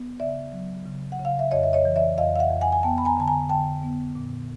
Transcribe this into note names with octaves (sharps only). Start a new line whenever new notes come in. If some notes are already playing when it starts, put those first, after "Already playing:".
Already playing: B3
C#3 D5 E5
F#3
C#3
F#5
C#3
F5
E5
F2 C#5 D#5
E5
C#5 D#5
E3
D5 E5
F2 D#5 F5
F5
E5 F#5
F2
F#5 G#5
G#5
B3 G5 A5
B5
G#5 A#5
D3 A5
G#5 A#5
D3 G5 A5
B3
A#2